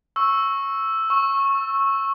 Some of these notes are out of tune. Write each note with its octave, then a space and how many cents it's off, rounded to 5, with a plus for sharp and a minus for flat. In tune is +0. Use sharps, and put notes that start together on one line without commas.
C#6 -10 E6 +0
C#6 -15 E6 +20